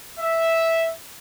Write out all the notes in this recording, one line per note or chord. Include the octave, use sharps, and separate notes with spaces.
E5